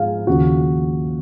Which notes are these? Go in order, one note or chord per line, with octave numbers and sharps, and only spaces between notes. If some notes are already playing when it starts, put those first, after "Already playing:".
Already playing: G#2 F3 G#4 F5
D#2 C#3 F3 F#4